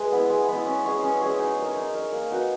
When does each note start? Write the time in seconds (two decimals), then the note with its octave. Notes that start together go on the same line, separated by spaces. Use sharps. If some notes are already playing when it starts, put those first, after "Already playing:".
Already playing: G#3 G#4 B4 E5
0.12 B3 E4
0.30 G#3
0.48 B3 E4
0.66 C#4
0.85 G#4 C#5 E5
1.03 C#4
1.21 G#4 C#5 E5
1.39 D#4
1.58 A#4 E5
1.77 D#4
1.94 A#4 E5
2.12 A#3
2.31 D#4 F#4 B4